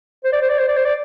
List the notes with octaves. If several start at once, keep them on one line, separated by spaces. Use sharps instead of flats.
C5
D5
C5
D5
C5
D5
C5
D5